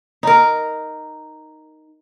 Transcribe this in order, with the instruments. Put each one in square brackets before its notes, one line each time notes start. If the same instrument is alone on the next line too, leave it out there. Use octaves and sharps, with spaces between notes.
[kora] D#4 A#4